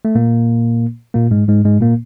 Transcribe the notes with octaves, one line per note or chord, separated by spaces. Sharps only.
A3
A#2 A#3
A#2 A#3
G#2 G#3
G#2 G#3
G#2 G#3
A#2 A#3